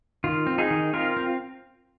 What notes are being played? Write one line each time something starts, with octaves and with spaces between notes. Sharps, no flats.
D#3 F4
C4
D#4 G#4
D#3
C4 F4 A#4
C4